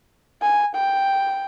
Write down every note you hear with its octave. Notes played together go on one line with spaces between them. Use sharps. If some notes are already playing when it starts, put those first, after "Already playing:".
G#5
G5